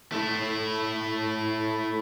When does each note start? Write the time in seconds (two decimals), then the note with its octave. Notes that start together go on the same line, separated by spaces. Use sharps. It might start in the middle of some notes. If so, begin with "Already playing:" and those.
0.12 A3 E4